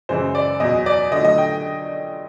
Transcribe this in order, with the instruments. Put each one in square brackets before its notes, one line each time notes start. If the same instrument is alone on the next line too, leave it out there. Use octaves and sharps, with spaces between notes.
[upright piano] F#2 C#3 E3 G#3 C5
D5
E2 B2 F#3 D#5
D5
D3 F#3 A3 D#5
D#5
G5